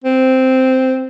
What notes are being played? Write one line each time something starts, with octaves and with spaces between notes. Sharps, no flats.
C4